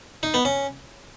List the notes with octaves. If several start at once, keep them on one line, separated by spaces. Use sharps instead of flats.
D#4
B3
C#4